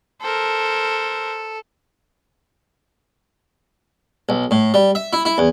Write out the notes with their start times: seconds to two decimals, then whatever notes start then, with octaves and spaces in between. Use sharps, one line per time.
0.21 A4 A#4 C5
4.29 B1
4.51 A2
4.74 G3
4.95 E5
5.13 E4
5.25 E4
5.38 E2